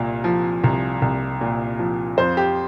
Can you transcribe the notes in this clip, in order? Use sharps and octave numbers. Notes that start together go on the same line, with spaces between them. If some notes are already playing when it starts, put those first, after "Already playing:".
Already playing: C2 A#2
F3
C2
C2
A#2
F3
F2 C5
G4